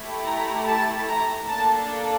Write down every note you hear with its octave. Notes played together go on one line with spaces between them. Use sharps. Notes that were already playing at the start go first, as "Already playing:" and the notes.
Already playing: A3 E4 G4
A#5
A5
A#5
A#3 D4 A4 A5